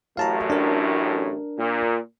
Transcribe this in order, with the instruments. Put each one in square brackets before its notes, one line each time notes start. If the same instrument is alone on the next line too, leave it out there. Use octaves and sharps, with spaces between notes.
[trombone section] A1 F#2 A2 [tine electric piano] F5 A5 A#5
[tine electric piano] D4 A#4
[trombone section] A#2